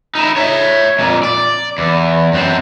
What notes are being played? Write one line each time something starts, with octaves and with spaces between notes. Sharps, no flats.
D#4 E4
C#5 E5
F2 A#2
D5
E2
F#2 C4